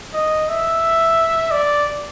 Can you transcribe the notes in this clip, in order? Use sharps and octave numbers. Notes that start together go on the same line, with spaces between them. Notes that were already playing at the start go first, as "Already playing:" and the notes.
D#5
E5
D5